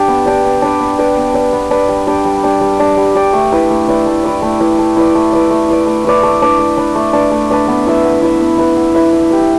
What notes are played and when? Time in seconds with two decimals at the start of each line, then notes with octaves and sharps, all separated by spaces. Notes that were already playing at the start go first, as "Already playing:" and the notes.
Already playing: D4 G4 D5
0.08 B3
0.26 D4 G4 D5
0.44 B3
0.62 D4 B4 D5
0.80 B3
0.99 D4 B4 D5
1.17 B3
1.34 D4 B4 D5
1.53 B3
1.71 D4 B4 D5
1.88 G3
2.07 D4 G4 D5
2.25 G3
2.43 D4 G4 D5
2.61 G3
2.80 D4 G4 D5
2.97 G3
3.15 D4 G4 D5
3.33 A3
3.52 E4 B4 D5
3.70 A3
3.89 E4 B4 D5
4.06 A3
4.24 E4 B4 D5
4.42 A3
4.60 E4 B4 D5
4.79 A3
4.97 E4 B4 D5
5.15 A3
5.32 E4 B4 D5
5.51 A3
5.68 E4 B4 D5
5.86 A3
6.05 E4 B4 D5
6.23 A3
6.42 D4 B4 D5
6.59 A3
6.77 D4 B4 D5
6.95 A3
7.13 D4 B4 D5
7.31 A3
7.50 D4 B4 D5
7.68 B3
7.86 E4 B4 E5
8.04 B3
8.22 E4 B4 E5
8.40 B3
8.58 E4 B4 E5
8.76 B3
8.95 E4 B4 E5
9.13 E4
9.30 G4 B4